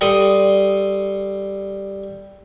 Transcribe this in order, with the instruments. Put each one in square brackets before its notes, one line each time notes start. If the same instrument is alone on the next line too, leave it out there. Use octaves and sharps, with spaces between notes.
[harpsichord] G3 A4 C6 D#6